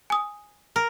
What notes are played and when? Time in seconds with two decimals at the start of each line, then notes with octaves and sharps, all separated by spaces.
0.10 G#5 D#6
0.76 A#4